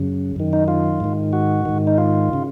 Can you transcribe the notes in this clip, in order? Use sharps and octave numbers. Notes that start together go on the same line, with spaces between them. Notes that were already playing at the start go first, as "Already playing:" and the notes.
Already playing: F#2 C#3
F#2 D#3
D#4
F4
G#2 D#3
F#4
G#2 D#3
D#4
F4
C#3